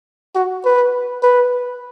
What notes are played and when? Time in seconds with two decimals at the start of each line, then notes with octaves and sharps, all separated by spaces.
0.35 F#4
0.65 B4
1.23 B4